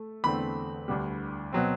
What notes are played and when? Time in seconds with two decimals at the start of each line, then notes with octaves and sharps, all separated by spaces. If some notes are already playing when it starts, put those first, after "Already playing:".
Already playing: A3
0.24 E2 D3 A3 C4 B5
0.88 D2 D3 G3
1.53 B2 F#3 C4